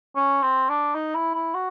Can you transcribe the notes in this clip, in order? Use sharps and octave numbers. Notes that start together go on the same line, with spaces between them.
C#4
C4
D4
D#4
E4
E4
F#4